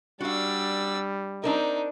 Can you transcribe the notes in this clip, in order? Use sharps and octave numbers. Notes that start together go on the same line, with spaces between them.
G3 D4 F#4 F5 E6
C4 D4 D#4 A#4